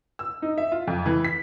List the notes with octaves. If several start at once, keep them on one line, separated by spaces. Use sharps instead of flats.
E6
D#4
E5
F4
F2
E3
B6